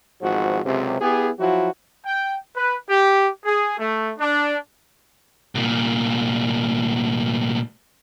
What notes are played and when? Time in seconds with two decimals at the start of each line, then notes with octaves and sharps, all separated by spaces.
0.21 G#1 E2 G#2 F3 F#4
0.65 C#2 F#2 C3
1.00 B3 E4 G4 G#4
1.39 F3 F#3 E4 F#4
2.06 G5
2.56 B4
2.89 G4
3.45 G#4
3.79 A3
4.19 D4
5.55 C2 A#2